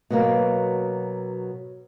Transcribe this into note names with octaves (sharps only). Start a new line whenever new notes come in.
B2 F#3 A#3 B3